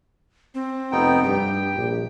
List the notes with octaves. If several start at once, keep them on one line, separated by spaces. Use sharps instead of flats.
C4
F1 B3 D#4 G5
G2 G4 G5
A#1